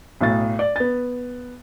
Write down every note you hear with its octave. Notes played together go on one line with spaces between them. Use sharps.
B1 A2 A6
D5
B3 A6